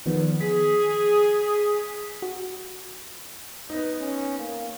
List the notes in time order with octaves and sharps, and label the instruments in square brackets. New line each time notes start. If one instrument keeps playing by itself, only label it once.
[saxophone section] E2 [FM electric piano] D#3 F3 B3
[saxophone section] G#4 [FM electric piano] B6
[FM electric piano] F#4
[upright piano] B3 D#4
[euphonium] C#4
A#3